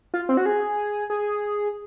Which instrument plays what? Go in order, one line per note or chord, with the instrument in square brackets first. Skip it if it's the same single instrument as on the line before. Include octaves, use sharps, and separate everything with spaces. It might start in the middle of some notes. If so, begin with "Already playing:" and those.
[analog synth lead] F4
C4
F#4
G#4
G#4